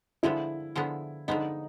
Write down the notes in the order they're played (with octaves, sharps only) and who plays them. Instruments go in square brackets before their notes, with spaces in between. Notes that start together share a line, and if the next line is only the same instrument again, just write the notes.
[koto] D3 F3 G#3 B3 [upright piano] E4
[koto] D3 F3 G#3 B3
[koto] D3 F3 G#3 B3 [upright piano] D#4